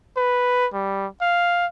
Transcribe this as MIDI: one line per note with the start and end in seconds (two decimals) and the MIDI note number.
0.17 0.67 71
0.73 1.07 55
1.21 1.66 77